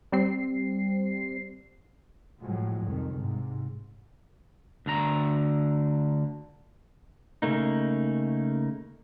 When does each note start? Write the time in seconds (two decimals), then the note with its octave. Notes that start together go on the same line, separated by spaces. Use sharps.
0.12 G3 C4 C7
2.41 A2 F3 F#3 G#3
2.87 C2 F2 D#3
3.19 G#2 C3
4.86 D2 D3 A#5
7.42 C#3 A3 A#3 D#4